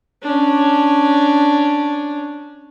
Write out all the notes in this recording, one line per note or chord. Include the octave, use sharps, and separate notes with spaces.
C#4 D4